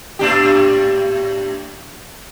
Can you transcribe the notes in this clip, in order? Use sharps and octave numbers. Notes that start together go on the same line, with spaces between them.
A2 D4 G4